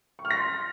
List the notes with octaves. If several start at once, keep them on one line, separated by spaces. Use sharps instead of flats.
C#6
F6
A#6
C6